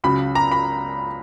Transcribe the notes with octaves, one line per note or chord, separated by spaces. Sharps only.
C#2 C#3 F#3 B5
A#5
B5